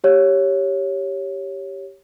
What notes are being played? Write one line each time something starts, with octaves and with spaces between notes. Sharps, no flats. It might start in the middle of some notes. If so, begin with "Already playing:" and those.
G4 C#5